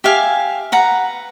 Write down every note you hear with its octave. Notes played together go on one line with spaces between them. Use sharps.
G4 E5 F5 G#5
B4 F#5 A#5